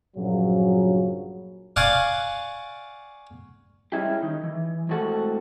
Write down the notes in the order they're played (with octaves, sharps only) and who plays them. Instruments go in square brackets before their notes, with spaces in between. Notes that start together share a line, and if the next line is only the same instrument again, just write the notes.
[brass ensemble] A#1 G2 C#3 F#3
[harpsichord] D5 F5 F#5 G#5 C#6 D6
[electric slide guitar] G3 G#3 C#4 E4 G4
D#3 D#4
E3
A2 G#3 C4 F#4 A4 F#5